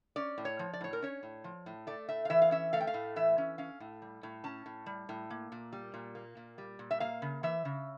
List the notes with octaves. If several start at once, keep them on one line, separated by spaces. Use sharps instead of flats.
C#4 D5
A2
C#5
F3
D5
A2 C#5
A#4
C#4 C#5
A2
F3
A2
A3 D5
A2 E5
F5
E3 E5
F5
C#4 E5
A3 F5
G5
F5
A2
E3 E5
C#4
C#4 F5
A2
G3
A2
C#4 A5
A2
G3
A2
A#3
A#2
G3
A#2
A#3
A#2
G3
A#2
E5
A#3 F5
C#3
E3 E5
C#3